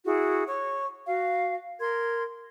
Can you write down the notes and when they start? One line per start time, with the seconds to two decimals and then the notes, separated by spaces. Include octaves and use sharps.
0.05 E4 F#4 G#4
0.47 C#5 C#6
1.07 F#4 F5
1.80 A#4 C6 G#6